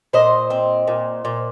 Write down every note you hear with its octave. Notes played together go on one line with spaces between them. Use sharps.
A#2 C5 D#5
C4
A#2
A#2